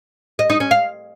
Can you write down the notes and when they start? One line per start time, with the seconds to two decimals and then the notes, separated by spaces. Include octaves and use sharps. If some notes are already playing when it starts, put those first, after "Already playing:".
0.39 D#5
0.50 D#4
0.60 C#4
0.71 F5